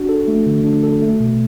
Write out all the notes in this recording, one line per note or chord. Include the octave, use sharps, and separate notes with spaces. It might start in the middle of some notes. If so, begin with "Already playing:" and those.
Already playing: D4 F#4
A4
A3
D3
D4
A4
A3
B2